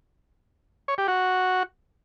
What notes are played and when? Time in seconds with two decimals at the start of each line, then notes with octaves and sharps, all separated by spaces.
0.88 C#5
0.98 G4
1.08 F#4